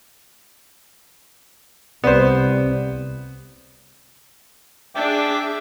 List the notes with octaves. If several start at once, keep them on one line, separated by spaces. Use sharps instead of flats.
C2 C3 B3 C5 D5
D4 G#4 E5 G5 D6